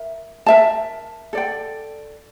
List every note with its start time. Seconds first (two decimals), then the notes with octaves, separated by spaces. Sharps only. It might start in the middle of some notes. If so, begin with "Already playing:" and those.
Already playing: A#4 E5
0.46 A#4 E5 A5
1.33 A4 D5 G5